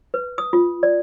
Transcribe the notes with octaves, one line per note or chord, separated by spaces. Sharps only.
B4
D#6
F4
D5